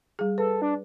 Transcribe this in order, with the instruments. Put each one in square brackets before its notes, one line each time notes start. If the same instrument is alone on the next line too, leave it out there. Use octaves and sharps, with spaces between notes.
[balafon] G3 G#4
[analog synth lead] A4 [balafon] B4
[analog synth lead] D4